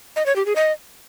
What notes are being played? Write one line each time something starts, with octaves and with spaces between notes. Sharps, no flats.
D#5
C#5
G4
G#4
D#5